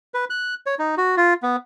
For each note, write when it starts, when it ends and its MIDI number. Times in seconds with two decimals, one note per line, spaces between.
0.14 0.25 71
0.30 0.55 90
0.66 0.75 73
0.79 0.95 63
0.97 1.15 66
1.17 1.34 65
1.43 1.56 59